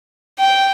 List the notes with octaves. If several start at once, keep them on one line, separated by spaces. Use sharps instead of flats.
G5